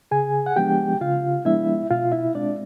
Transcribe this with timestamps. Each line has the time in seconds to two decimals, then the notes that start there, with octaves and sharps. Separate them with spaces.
0.11 C#3 G#4 G#5
0.46 F#5
0.56 F3 G#3 B3 D4 G4 G5
1.01 C#3 F4 F5
1.45 F3 G#3 B3 D4 E4 E5
1.90 B2 F4 F5
2.12 E4 E5
2.35 G#3 C4 D4 D5